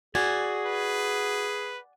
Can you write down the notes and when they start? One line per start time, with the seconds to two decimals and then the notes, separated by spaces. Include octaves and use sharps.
0.15 F#4 G#4 D5 G#5
0.66 B4